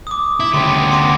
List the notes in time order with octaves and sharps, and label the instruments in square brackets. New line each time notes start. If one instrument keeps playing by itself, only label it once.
[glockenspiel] D6 D#6
[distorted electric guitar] E4
[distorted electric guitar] D2 C#4 [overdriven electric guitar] G3 B3 [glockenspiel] C6
[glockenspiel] C6 D6 A#6